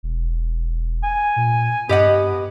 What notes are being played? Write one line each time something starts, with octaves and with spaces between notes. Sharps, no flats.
E1
G#5
A#2
G2 B3 G4 D#5 F#5